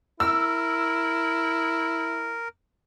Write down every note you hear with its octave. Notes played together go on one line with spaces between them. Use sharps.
E4 A#4 E6